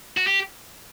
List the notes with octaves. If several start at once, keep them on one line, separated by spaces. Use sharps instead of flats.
F#4
G4